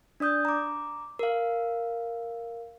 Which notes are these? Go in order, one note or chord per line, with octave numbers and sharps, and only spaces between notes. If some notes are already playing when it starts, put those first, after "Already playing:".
D4 D5 D#6 G6
A#5 D6
A#4 F5